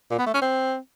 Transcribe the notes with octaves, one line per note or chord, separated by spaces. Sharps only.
A#2
B3
A3
C#4
C4